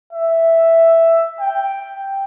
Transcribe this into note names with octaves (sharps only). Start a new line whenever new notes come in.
E5
G5